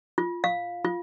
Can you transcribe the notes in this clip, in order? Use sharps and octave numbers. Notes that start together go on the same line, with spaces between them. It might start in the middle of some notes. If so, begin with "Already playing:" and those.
F4
F5
F4